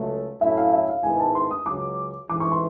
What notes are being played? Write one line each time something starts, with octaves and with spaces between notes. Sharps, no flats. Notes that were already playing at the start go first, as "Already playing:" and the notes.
Already playing: C#2 C#3 F#3 A3
A2 F#3 A3 C#4 E4 E5
F5
E5
F5
G#2 D#3 G#3 B3 E4 G#5
A5
C6
D#6
C#2 C#3 F#3 D6
A1 G#2 E3 D6
C#6
C6